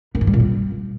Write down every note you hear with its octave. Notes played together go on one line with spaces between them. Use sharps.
D#3
G#2
G3
A#2
G3